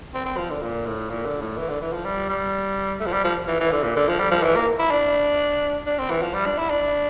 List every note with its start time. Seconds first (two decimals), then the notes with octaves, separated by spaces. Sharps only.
0.14 C4
0.26 C4
0.38 F3
0.50 D3
0.62 A#2
0.86 A2
1.10 A#2
1.26 D3
1.41 A2
1.57 E3
1.69 D3
1.81 E3
1.93 F3
2.05 G3
2.29 G3
3.00 A3
3.07 F3
3.13 G3
3.24 F3
3.48 E3
3.60 E3
3.72 D3
3.84 A#2
3.96 D3
4.08 F3
4.20 G3
4.31 F3
4.44 E3
4.55 A#3
4.79 E4
4.91 D4
5.87 D4
5.99 C4
6.10 E3
6.22 F3
6.34 G3
6.46 D4
6.58 E4
6.70 D4